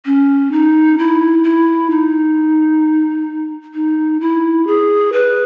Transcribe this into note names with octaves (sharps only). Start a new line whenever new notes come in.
C#4
D#4
E4
E4
D#4
D#4
E4
G#4
B4